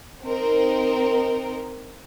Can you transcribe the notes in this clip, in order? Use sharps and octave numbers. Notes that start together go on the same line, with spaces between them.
C4 D#4 A#4